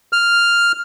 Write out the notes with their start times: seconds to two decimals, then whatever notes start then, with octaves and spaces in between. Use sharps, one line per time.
0.13 F6